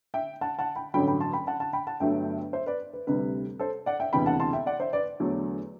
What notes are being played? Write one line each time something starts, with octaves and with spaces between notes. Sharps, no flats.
E5 G5
F#5 A5
F#5 A5
G5 B5
A1 G2 D3 F#3 G5 B5
G5 B5
A5 C6
G5 B5
F#5 A5
F#5 A5
G5 B5
F#5 A5
G1 G2 F#3 A3 E5 G5
C5 E5
B4 D5
B4
D2 C3 G3 B4
A4 C5
D5 F#5
E5 G5
E1 D2 C3 E3 G5 B5
F#5 A5
A5 C6
E5 G5
D5 F#5
C5 E5
B4 D5
E2 D3 F#3 A3